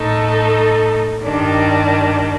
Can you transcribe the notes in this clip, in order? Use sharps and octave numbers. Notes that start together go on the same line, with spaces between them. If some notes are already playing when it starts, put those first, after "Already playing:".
Already playing: A2 A3 D#4 A4
G2 D#3 G3 D4